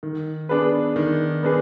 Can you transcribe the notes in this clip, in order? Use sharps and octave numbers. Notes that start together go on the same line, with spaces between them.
D#3
B3 D4 G#4 B4
D#3
B3 D4 G#4 B4